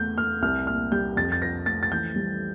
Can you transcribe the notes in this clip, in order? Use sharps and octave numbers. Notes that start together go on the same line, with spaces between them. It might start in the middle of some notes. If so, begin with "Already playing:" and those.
Already playing: E2 A3 G6
A3 F6
C2 F6
A#2 F6
G3 G6
F2 A6
A6
F3 A#6
A3 A6
A6
E3 G6
G3